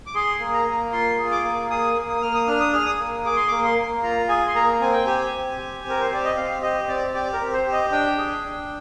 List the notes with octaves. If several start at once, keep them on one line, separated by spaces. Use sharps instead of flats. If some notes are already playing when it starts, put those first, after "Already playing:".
D6
G#4 C6
A#3
A#5
A#3
F4 C6
G#4
D6
A#3
G#4 D#6
A#3
D#6
A#3 F6
D#6
D4 F6
D#6
G#4 F6
D#6
A#3
G#4 D6
C6
A#3 D6
C6
A#3
F4 A#5
G#4 G#5
C6
A#3 A#5
C4 G#5
G5
G4 G#5
C4
G4
C4
A#4
C5
G4 D5
D#5
C4 F5
G4 D#5
C4 D5
G4 D5
A#4
C4
C5
G4
D#5
D4 G5
G#4
D4